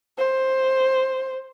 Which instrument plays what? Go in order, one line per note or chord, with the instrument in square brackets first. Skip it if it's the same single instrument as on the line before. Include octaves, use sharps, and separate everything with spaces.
[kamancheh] C5